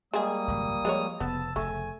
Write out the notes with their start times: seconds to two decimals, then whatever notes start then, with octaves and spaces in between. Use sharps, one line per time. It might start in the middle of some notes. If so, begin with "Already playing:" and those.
0.13 G3 G#3 A#3 G#4 D#6
0.48 G#1 C#2 F#2
0.85 F3 G#3 B4 C#5
1.20 F1 C#3 B3 A5 E6
1.56 F1 A2 C#3 A3 G#5